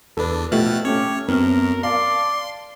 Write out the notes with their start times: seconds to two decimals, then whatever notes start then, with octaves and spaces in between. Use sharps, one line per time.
0.17 E2 D4 A4 B4
0.52 B2 F3 A3 G4 F6 F#6 A6
0.85 A3 C#4 G4 C#5
1.29 F#2 B3 C4 A#4 F6
1.83 D5 F5 A5 C6